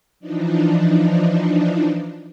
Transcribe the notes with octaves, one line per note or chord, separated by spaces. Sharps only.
E3 F3 D4 D#4